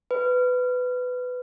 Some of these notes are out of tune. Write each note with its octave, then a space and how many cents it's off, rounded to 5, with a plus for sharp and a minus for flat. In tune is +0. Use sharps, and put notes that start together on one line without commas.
B4 +15